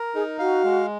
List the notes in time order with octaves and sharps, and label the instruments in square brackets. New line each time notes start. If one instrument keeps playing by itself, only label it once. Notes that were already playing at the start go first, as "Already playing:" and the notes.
Already playing: [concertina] A#4
[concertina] D#4 [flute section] G#4
[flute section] F#4 [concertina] F5
[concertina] G#3